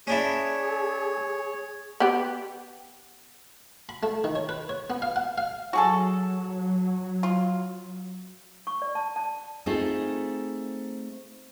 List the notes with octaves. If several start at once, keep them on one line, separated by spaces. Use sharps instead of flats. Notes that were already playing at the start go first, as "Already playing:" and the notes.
C#4 D4 E4 G#4 C#5
B3 G4
B5
A3
D#3
C#5
B4
C#5
B3
F5
F#5
F5
F#3 F#4 G#4 A4
F4
C#6
D5
A5
A5
A3 C4 D#4 F4 G#4